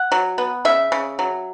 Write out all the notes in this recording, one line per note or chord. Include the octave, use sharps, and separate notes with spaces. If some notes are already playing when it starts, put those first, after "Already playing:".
Already playing: F#5
F#3
B3
C#3 E5
C#3
F#3